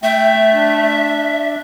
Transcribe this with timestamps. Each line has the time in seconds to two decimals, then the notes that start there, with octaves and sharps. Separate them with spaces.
0.03 A3 E5 G5
0.54 D4